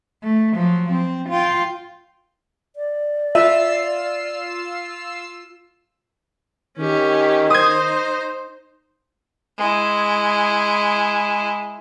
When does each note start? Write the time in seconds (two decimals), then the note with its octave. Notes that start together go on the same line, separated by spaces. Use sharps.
0.23 A3
0.54 F3 F#3
0.92 C4
1.29 F4 G5
2.76 D5
3.35 F4 E5 E6 C7
6.78 D#3 C#4 G4
7.50 D#4 C5 D#6 G#6
9.58 G#3 E4